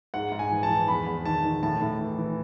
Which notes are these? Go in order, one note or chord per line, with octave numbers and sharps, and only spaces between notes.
G#2 F#5
G#2
G#5
E3
A5
E3
E2 B5
E2
D#3 A5
D#3
A2 A5
A2
E3
E3